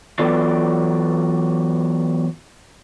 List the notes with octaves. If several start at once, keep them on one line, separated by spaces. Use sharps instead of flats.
E3 F#3 B3 F4 A4 D5